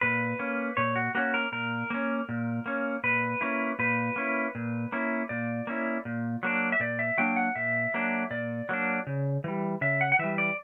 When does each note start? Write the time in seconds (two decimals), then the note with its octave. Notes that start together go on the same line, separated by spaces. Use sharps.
0.01 A#2 B4
0.39 A#3 C#4
0.77 A#2 C#5
0.96 F#4
1.15 A#3 C#4 F#4
1.34 A#4
1.52 A#2 A#4
1.90 A#3 C#4
2.29 A#2
2.66 A#3 C#4
3.04 A#2 B4
3.41 A#3 C#4 E4
3.79 A#2 B4
4.16 A#3 C#4 E4
4.55 A#2
4.92 A#3 C#4 E4
5.29 A#2 D5
5.67 A#3 C#4 E4
6.05 A#2
6.43 F#3 A#3 D4
6.72 E5
6.80 A#2 D5
6.99 E5
7.18 F#3 A#3 D4 G5
7.36 F#5
7.55 A#2 E5
7.94 F#3 A#3 D4
8.30 A#2 D5
8.69 F#3 A#3 D4
9.07 C#3
9.44 E3 G3
9.81 C#3 E5
10.01 F#5
10.12 F#5
10.19 E3 G3 E5
10.38 D5